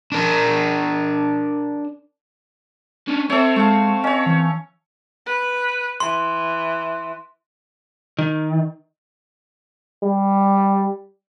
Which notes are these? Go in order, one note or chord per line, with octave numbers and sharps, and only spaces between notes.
D4 A#4
C#4 D4
C4 A4 C#5 E5
G#3 A3 F5
C#4 C#5 D#5
E3
B4
E3 C6
D#3
G3